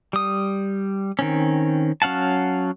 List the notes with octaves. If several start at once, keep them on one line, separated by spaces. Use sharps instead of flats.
G3 D#6
D#3 C4 C#4
F#3 C#4 F5 F#5 A5